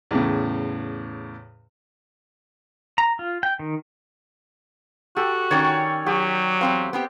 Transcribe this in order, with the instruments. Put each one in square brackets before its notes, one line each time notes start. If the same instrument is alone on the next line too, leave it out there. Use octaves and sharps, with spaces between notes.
[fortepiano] E2 A2 C#3
[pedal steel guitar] A#5
F4
G5
D#3
[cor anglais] F#4 [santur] G4 A4
[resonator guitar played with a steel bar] D#3 C#4 [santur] C#5 D5 G5
[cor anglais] F#3 [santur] G4
[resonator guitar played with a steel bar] E2 C4 F5 [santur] C5
[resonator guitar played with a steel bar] B3 C4 G4